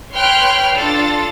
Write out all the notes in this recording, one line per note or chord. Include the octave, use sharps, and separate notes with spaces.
B4 C#5 G5 C6 F6 F#6
D4 F4 A4 A6